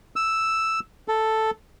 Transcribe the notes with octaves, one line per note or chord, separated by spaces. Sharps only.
E6
A4